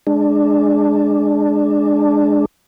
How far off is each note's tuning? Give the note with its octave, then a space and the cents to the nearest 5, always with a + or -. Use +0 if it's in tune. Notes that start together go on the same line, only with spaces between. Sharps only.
G#3 +0 D4 +5